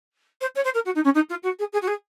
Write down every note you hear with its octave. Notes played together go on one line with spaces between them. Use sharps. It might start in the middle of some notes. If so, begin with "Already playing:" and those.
C5
C#5
C5
A#4
F#4
D#4
C#4
D#4
F4
F#4
G#4
G#4
F#4
G#4